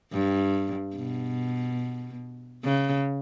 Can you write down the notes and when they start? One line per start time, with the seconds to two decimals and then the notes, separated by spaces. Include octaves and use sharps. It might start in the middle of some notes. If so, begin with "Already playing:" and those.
0.13 G2
0.96 B2
2.64 C#3